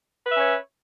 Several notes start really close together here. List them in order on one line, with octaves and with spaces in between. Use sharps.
B4 E5 C#4 C#5